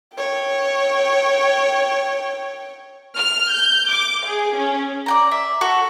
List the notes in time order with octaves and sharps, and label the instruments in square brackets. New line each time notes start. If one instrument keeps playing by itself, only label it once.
[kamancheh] C#5 G5
[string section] F6
G6
D6
G#4
C#4
[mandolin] D5 G5 A#5
E5
F#4 A4